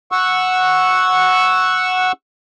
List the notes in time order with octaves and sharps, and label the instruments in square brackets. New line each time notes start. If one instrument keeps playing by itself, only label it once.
[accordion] F#5 C#6 E6